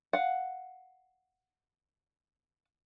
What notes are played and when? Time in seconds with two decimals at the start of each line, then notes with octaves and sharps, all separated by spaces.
0.13 F5 F#5